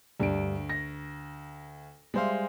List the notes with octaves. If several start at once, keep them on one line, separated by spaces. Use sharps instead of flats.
D2 G2 D7
A#6
G3 G#3 C5 E5 F5 C6